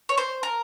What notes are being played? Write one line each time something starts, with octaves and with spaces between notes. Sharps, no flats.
C#5
C5
A#4